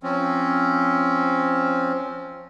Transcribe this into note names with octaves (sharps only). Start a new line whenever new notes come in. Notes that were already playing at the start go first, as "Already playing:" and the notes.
F3 C4 C#4